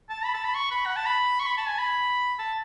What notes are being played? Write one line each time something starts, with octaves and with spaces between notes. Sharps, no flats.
A5
B5
A5
B5
C#6
B5
F#5
A5
B5
C#6
B5
A5
G#5
B5
A5